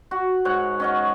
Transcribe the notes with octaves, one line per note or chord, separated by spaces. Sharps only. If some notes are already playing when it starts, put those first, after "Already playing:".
F#4
G#2 C#5 F#5
C#4 D#5 F#5